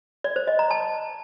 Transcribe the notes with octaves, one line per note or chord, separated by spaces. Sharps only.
D5
C5
D#5
A#5
A5